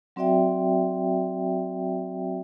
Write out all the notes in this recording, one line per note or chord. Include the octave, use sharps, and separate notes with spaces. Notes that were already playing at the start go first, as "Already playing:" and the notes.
F#3 C4 F#4 D5 E5 G5